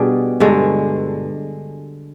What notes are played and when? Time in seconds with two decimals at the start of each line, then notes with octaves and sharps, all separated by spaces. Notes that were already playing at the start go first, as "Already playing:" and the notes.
Already playing: B2 G3 D4 G#4
0.40 G2 D3 G#3